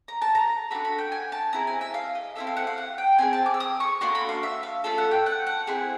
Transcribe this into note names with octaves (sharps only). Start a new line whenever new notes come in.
A#5
A5
A#5
D4 F#4 A4 B5
B5
G5
G#5
A5
C4 E4 G#4 A#5
G#5
E5
F5
D#5
C4 E4 A4 E5
F5
F#5
F5
F#5
G5
C4 E4 G#4 G#5
A5
D6
E6
D#6
C#6
A#3 D4 F#4 A4 C6
B5
F5
E5
F5
A3 C#4 F4 A4 E5
F#5
G5
F#5
F#5
C4 E4 G#4